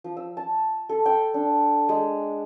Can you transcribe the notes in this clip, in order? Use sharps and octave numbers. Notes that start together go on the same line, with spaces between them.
F3
E6
A5
A4
G5
D4
G#3